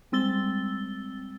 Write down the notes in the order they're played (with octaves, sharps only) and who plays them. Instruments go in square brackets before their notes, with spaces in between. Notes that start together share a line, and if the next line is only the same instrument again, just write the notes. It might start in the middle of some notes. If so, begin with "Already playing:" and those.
[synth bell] G3 G#3 C4 E6 A6 G7